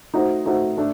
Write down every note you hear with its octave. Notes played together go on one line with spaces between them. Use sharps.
A3 D#4 F#4 C5
A3 D#4 F#4 C5
A3 D4